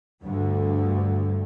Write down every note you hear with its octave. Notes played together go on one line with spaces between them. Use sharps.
D2 G2 D3